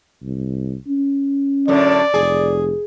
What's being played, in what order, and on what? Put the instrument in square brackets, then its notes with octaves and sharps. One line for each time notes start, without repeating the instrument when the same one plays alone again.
[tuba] C2
C#4
[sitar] F#2 A2 D3 [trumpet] D5
[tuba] F1 [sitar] G#4